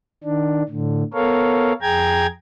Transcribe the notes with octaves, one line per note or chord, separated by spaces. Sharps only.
D#3 D4
A2 D3
B3 A4 A#4 C#5 F5
F2 G#4 G5 A#5 G#6